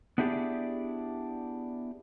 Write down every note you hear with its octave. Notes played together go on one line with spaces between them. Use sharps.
B3 D4 E4 G4 G#4 D5